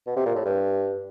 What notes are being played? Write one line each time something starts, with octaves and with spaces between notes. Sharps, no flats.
B2
C3
A#2
A2
G2